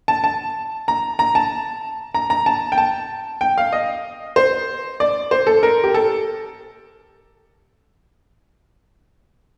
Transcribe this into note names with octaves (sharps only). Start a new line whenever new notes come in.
A5
A5
A#5
A#5
A5
A#5
A#5
A5
G5
A5
G5
F5
D#5
C5
D5
C5
A4
A#4
G4
A4